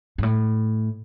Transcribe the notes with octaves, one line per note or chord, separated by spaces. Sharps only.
G2
A2